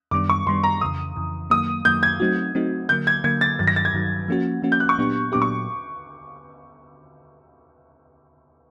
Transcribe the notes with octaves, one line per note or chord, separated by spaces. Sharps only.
F#2 D#3 G3 B3 D4 D6
C#6
F#2 D#3 G3 B3 D4 C6
A#5
F2 C#3 E3 D#6
F2 C#3 E3
F#2 D#3 F#3 A#3 D#6
F#2 D#3 F#3 A#3 G6
G#6
F#3 A3 C4 D#4 F#4
F#3 A3 C4 D#4 F#4
D3 F#3 A#3 G6
G#6
D3 F#3 A#3 G#6
A6
G2 D#3 F#3 A6
A#6
A6
G#6
G2 D#3 F#3
F3 A#3 C#4 F#4
F3 A#3 C#4 F#4
G6
F#6
C#6
A#2 F#3 B3 D4 G4
A#2 F#3 B3 D4 G4 D6
C#6